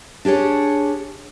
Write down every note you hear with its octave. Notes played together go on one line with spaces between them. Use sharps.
D4 G4 G#4 C#5